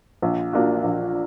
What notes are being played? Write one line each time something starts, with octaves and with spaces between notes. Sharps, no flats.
A#1
A#2 A#3 D4 F#4
A#1